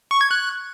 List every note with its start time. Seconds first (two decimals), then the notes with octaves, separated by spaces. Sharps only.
0.11 C#6
0.21 G#6
0.31 F#6